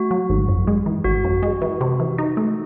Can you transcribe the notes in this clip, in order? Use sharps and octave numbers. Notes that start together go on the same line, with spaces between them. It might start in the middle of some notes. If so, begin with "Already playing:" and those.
Already playing: A3 F#4
F#3
G#1
F#2
G#3
E3
G#1 F#4
F#2
G#3
E3
C3
E3
D#4
A3